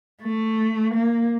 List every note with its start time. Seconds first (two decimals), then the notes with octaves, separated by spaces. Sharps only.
0.22 A3
0.94 A#3